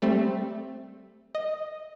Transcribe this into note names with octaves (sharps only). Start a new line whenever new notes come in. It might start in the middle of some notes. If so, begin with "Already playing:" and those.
G3 A3 C4
D#5